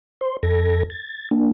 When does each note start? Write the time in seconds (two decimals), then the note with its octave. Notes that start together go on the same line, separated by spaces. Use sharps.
0.21 C5 C6
0.43 F2 A4 G#6 A#6
0.90 G#6 A6
1.31 A#3 D4